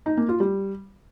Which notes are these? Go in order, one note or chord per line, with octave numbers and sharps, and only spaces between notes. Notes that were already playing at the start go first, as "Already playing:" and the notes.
D#4
A#3
F4
G3